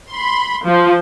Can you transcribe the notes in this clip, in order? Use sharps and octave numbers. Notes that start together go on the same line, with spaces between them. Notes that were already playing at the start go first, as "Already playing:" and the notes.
B5 C6
F3